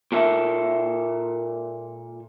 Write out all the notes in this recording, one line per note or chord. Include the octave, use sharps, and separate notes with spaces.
A#2 A#3 A4 E5